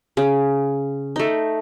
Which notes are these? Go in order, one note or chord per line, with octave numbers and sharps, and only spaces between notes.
C#3
A3 D#4